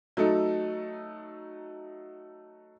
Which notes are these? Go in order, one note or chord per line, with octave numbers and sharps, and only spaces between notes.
F#3 A3 D#4 A4